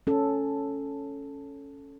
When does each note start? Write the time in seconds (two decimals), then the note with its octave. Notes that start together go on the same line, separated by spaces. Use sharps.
0.07 C#4 A4